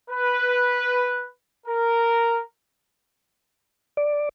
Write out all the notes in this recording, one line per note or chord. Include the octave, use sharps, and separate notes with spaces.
B4
A#4
D5